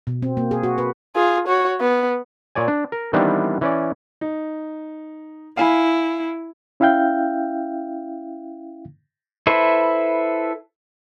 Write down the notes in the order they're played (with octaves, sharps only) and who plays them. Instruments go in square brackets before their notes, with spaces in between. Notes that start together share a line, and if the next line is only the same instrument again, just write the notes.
[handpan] B2
C4
A#3
G#4
F#4
B4
[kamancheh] F4 G#4
F#4 C#5
B3
[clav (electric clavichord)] A#2 C#5 D5 G#5
D4
A#4
D#3 E3 G3 B3 C4 D4
E3 C#4 D5
[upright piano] D#4
[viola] E4 [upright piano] F5 G#5 B5
[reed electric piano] C#4 E4 E5 F5 G5 G6
[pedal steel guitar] E4 A4 B4 C5 E5